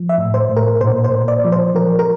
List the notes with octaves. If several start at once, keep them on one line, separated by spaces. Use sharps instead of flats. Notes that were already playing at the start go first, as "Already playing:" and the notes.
Already playing: F3
E5
A2
C5
A2
A#4
A#2 C5
C5
A#2
D5
F3
C5
F3 A#4
A#4